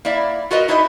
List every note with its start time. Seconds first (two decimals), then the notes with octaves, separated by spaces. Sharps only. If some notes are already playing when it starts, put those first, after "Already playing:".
0.05 A#3 E4 D5 E5
0.51 F4 F#4 A#4 B4 D#5
0.68 D#4 E4 B4 C5 D#5 E5